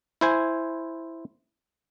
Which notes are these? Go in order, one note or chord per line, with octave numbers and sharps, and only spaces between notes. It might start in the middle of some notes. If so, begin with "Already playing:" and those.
E4 C5 G#5